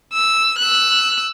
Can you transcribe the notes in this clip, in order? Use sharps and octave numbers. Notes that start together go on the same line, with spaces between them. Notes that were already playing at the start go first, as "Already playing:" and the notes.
E6
E6 F#6